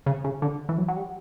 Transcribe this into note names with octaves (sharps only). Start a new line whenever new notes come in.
C#3
C#3
D3
E3
F#3
F#3
G3